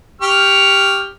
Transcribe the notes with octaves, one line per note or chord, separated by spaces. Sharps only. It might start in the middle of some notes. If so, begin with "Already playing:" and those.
G4 C#6 F6